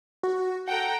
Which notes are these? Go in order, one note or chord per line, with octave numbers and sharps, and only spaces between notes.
F#4
A4 F#5 G5 A#5